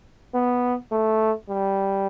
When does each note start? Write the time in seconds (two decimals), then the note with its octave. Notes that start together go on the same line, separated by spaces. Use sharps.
0.34 B3
0.91 A3
1.49 G3